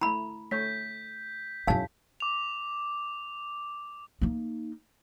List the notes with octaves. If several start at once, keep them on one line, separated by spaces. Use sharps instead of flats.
A3 E4 A#5 B5
A3 C#5 G6 B6
F#2 D#4 E4 G#4 C#5 F5 A5
D6 F7
A#3 D#4